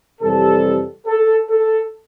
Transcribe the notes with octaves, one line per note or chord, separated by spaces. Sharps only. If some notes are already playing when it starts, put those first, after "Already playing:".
F2 C3 E3 G3 A4
A4
A4